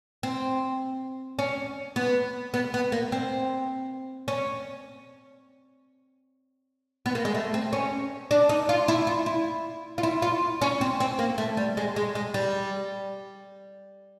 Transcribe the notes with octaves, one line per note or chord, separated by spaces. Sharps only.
C4
C#4
B3
B3
B3
A#3
C4
C#4
B3
A#3
G#3
A3
C4
C#4
D4
D#4
F4
E4
F4
E4
F4
E4
F4
C#4
C4
C4
A#3
A3
G3
G#3
G#3
G#3
G3